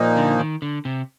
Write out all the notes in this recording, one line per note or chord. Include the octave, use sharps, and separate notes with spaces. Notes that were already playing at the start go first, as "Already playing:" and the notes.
Already playing: A#2 F3 A#3 D#4
D3
D#3
D3
C3